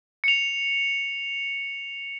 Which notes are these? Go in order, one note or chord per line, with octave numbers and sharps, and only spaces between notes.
C#7 F7